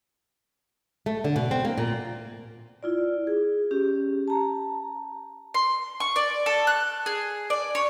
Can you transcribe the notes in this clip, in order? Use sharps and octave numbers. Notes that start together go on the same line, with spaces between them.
A3
D3
B2
C4
A#3
A#2
E4 F4 D5
G#4
C#4 G4
A5 A#5
C6
C#6
D5
A4
F#6
G#4
D5
C#5